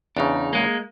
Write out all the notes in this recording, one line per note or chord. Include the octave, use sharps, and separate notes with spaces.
E2 C#3 D4 D#4
G#3 A#3